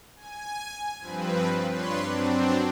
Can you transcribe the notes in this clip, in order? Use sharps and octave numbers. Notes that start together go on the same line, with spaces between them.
G#5
G2 F3 C4 B4
G2 D4 B4 C#5 C6
F#3 C4 D4